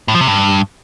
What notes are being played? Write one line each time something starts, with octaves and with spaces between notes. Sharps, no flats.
A2
F3
C3
G2